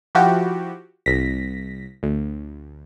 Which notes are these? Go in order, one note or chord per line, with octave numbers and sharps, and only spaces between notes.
F3 E4 F#4 G4
C2 A#6 B6
D2